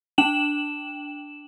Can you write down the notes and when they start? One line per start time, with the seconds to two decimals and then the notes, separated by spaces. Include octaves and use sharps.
0.18 D4 G5 E7 F#7